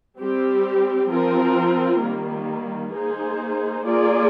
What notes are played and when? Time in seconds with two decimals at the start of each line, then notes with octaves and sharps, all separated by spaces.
0.19 G3 C4 G4
1.10 F3 C4 F4 A#4
2.01 D#3 G3 A#3
2.93 A#3 D#4 G#4 C5
3.85 A#3 F4 G#4 D5